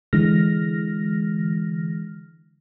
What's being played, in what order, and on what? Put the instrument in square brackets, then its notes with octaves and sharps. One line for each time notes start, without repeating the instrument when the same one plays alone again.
[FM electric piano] D3 E3 G#3 F6 A#6